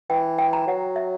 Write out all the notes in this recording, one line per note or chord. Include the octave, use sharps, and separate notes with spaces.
E3 G5
G5
A#5
F#3 F#5
E5